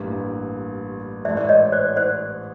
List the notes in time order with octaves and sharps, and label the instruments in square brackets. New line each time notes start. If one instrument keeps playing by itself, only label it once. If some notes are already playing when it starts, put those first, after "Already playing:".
Already playing: [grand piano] A1 G2 E3 G3 A#3
[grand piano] A1 G#2 E3 A3 [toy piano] D5 E5
[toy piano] D5
C#5 D#5
C5 D5
C5 D5